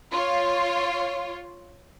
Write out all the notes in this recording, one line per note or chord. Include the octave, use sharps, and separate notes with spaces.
F4 C#5